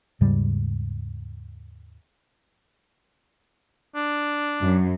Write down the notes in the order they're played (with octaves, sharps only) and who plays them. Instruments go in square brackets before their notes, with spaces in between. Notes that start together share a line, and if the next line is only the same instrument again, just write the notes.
[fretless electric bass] D#2 G#2 C#3 G3
[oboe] D4
[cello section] F#2